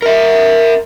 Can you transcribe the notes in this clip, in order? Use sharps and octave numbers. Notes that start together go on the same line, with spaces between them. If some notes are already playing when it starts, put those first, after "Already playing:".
A#4 E5